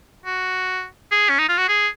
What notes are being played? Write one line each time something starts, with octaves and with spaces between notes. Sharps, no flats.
F#4
G#4
C#4
D#4
F4
F#4
G#4